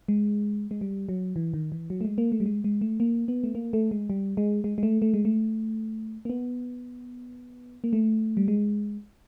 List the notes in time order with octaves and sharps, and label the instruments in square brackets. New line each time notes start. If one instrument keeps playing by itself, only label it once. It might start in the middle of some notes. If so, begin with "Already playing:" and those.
[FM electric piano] G#3
G#3
G3
F#3
E3
D#3
E3
F#3
A3
G#3
A#3
A3
G3
G#3
G#3
A3
A#3
B3
A3
A#3
A3
G#3
G3
G#3
G#3
G#3
A3
A3
G#3
A3
A#3
B3
A#3
A3
G3
G#3